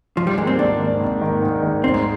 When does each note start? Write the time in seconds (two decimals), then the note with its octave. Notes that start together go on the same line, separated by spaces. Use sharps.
0.16 G#2 F3
0.27 G3
0.37 D#3 G#3 A#3
0.47 C4
0.58 G#2 D4
0.79 D#3 A#3
1.00 G#2
1.21 D#3 A#3
1.42 G#2
1.62 D#3 A#3
1.84 G#2 C4
1.94 G#3